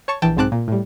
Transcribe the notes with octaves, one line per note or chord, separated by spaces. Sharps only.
C#5 A5 C#6
A#1 E3 G5 A5
B1 G#2 C4 A5 D6 F#6
A#2
A2 G3